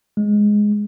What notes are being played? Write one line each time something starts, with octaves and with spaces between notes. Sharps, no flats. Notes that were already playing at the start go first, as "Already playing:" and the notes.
G#3